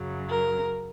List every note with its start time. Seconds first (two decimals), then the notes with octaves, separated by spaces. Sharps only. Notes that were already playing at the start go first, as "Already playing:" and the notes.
Already playing: F#2 C#3 F#3
0.29 A#4